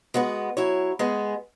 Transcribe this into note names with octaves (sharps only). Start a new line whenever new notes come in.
G#3 B3 F#4 B4
F#3 E4 C#5
G#3 B3 G#4